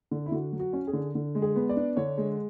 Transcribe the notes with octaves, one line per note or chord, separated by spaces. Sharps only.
D3
E4
D3 F#4
F#3
F#4
C#4
G#4
D3
D3
G#3
G#4
B3
D5
D4
D3 C#5
G#3